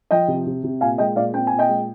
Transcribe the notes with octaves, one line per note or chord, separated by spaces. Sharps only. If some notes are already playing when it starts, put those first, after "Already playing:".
F3 D#5 G5
C3
C3
C3
A#2 F5 G#5
G#3 D#5 G5
A#2 D5 F5
C4 G5
A#2 G#5
D#5 G5
G#3